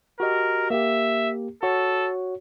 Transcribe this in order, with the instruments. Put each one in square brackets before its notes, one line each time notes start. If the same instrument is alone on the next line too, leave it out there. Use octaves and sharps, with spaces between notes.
[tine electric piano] F#4 G4 D#5 [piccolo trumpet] A#4
[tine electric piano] A#3 G4 [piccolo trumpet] E5
[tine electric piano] F#4 C#5 [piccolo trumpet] A4